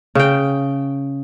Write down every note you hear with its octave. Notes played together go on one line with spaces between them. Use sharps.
C#3 G5